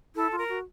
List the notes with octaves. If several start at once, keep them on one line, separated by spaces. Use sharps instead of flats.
E4 A4
F4
A#4
F#4